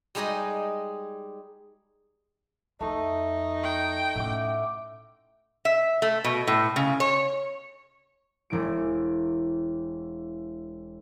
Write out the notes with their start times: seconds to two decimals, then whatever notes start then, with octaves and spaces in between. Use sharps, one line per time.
0.15 G3 G#3 D#4 G4 G#4 D#5
2.81 F2 A3 D#4
3.64 G5 C6
4.15 A2 C#4 E5 F#5 D6
5.65 E5
6.02 A3
6.24 B2
6.47 A2
6.76 C#3
7.00 C#5
8.50 E1 E3 D7